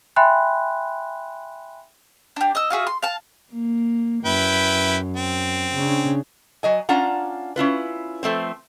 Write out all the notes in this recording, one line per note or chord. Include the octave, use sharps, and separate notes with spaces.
E5 G5 G#5 B5 C6 F#6
D4 G4
D#5 E6
F4 F#4 G#4 E5
C6
F5 A5
A#3
F#2 E4 B4 G5
C4
C#3 C#4 D4
F#3 D#5 G#5
C#4 D4 F4 F#5 A#5
C#4 E4 F4 B4
F3 A3 C4 C5